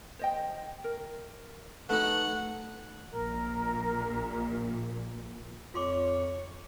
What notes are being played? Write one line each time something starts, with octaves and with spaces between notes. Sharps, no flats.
C5 D#5 G5
A#4
A3 D#4 F#4 B4 F#5 F#6
A#1 A#2 A#4
F2 F4 C#5 C6 D6